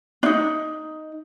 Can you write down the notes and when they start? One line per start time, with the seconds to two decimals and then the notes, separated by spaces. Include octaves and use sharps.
0.23 D4 D#4